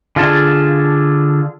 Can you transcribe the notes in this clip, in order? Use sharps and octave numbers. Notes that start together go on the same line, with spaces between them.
D3 F4 G#4 D5 A5